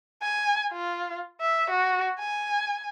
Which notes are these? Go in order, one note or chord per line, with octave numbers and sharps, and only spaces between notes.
G#5
F4
E5
F#4
G#5